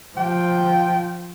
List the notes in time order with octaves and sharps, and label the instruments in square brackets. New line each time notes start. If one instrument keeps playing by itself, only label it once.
[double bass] F3 [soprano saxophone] G5